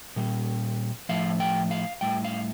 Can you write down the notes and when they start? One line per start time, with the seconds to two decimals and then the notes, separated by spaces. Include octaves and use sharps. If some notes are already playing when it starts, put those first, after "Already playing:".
0.16 A#2 G3
1.09 A2 F3 F5
1.40 G5
1.71 F5
2.01 A2 G3 G5
2.25 F5